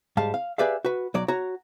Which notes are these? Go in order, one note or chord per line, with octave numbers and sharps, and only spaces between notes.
G#2 G3 G#3 F5 A5
F5
G4 G#4 B4 D5 E5 F5
F#4 B4
B1 F#3 D5
F#4 C#5 A#5